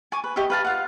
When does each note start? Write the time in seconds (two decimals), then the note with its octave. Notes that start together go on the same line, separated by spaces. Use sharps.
0.12 G#5 C#6 D6
0.24 B4
0.36 G4 C#5 D#5 E5
0.50 B4 F5 A5
0.65 F4 F5 F#5